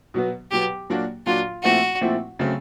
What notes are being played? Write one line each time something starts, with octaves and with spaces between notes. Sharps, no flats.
B2 F#3 B3
B2 F#3 B3 G4
A#2 F#3 A#3 D4 F#4
A#2 F#3 A#3 D4 F4 F#4
A#2 F3 A3 C4 E4 F#4
A#2 F3 A3 C4 E4
C#3 F#3 A3 C4